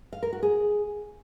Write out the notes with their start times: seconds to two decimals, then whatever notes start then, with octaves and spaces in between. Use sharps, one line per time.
0.13 F5
0.23 A#4
0.33 F#4
0.43 G#4